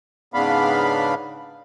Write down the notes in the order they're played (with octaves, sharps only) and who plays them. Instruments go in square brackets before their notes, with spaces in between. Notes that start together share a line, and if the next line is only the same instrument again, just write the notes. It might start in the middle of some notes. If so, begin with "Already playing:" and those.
[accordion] G#2 C#3 B3 D4 F5 B5